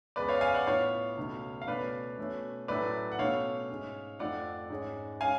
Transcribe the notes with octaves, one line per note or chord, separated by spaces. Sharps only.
C#2 C#3 G#3 B3 B4 D5
C#5 F5
F5 G#5
D5 F#5
A2 F3 B3 C#5 F5
C#2 B2 A3 C#4
F5
B2 A3 C#4 B4 D5
B2 A3 C#4
A2 F#3 A3 C#4 B4 D5
F#5
B2 A3 C#4 C#5 F5
G#2 G#3 C#4
F2 F3 A3 D5 F#5
G#2 G#3 C#4
G#3 C#4 F5 G#5